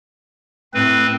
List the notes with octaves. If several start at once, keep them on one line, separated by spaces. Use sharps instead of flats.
A2 C4 B4